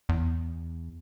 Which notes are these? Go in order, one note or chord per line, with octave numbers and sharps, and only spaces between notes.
E2